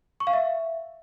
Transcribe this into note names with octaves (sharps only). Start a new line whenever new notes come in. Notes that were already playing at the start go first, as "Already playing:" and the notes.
C#6
F5
E5